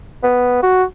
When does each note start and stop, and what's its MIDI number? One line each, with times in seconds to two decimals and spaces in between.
0.23 0.62 59
0.63 0.84 66